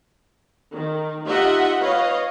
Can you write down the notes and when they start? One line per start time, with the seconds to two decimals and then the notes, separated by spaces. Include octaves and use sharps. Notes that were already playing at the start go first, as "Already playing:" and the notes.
0.73 D#3
1.27 D#4 F4 G4 D#5 E5 F#5
1.81 B4 C#5 D#5 F5